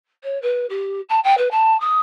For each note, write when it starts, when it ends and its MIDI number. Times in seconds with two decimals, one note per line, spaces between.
0.23 0.40 73
0.41 0.66 71
0.69 1.00 67
1.09 1.19 81
1.23 1.34 79
1.37 1.48 71
1.51 1.79 81
1.80 2.00 87